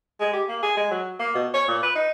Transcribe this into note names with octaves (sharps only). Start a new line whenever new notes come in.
G#3
G4
A#3
G#4
G#3
F#3
A#3
B2
C#5
A#2
B4
D#4